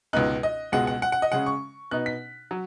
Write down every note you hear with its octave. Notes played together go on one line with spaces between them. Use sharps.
C#2 B2 B3 D#4 F#6
D#5
C#2 B2 G#3 F#5
F#5
F#5
F#5
D#5
C#3 G#3 C#4 F#5
C#6
B2 B3 D#4 F#6
B6
F#3